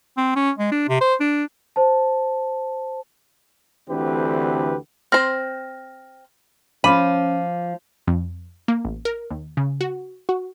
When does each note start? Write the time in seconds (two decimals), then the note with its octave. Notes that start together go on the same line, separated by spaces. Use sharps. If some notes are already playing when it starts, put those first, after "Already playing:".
0.17 C4
0.36 C#4
0.58 G#3
0.72 D4
0.89 C3
1.01 C5
1.20 D4
1.76 C5 A5
3.89 D2 D3 E3 C4 G4 B4
5.12 C4 C5 F6 A#6
6.84 F3 C#4 F4 B5 D6 D#7
8.07 F2
8.68 A#3
8.85 A1
9.05 A#4
9.31 D#2
9.57 C#3
9.81 F#4
10.29 F#4